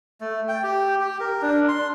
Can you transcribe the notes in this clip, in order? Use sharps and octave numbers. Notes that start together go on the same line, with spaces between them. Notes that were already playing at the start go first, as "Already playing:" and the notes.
A3
G5
G4
G4
A#4
D4
C6